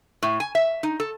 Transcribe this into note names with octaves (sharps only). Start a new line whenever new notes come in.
A2
G#5
E5
D#4
A4